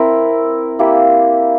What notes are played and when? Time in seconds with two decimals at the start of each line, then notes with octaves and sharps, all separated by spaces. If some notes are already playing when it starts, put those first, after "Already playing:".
Already playing: C4 E4 A#4
0.79 A#3 E4 G4